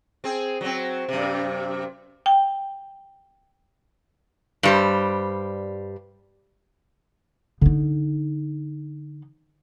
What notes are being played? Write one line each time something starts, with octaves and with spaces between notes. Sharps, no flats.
C4 G#4
F#3 C4
F#2 C3
G5
G2 G3 C5
D3 D#4